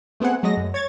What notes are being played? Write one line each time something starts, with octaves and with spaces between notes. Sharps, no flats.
A3 B3 C4 G#4 F#5
F#3 G#3 A3 D#5 A#6
F#2
C#5 G#6 A6